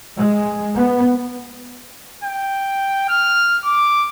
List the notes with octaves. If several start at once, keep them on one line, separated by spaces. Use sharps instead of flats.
G#3
B3
G5
F6
D6